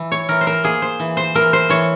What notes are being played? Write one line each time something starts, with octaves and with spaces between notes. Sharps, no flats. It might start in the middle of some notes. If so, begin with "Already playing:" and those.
Already playing: E3
C#5
E3 A#4
C5
A#4
A#3 G#4
C5
E3
C5
E3 A#4
C5
E3 C#5